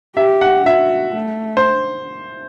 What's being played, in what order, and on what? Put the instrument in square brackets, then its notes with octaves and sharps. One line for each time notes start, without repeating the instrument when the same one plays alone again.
[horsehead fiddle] G4 [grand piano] E5
[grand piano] F#5
[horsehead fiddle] F#4 [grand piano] E5
[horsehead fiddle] A3
[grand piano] C5